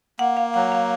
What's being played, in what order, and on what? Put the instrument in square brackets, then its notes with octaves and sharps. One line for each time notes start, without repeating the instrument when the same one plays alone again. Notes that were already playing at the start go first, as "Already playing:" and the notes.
[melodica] A#3 [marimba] F#5
[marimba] F5
[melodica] F#3 [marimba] F#5
[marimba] F5